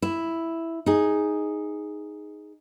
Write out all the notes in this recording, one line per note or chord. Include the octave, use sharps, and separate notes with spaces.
E4
D#4 G#4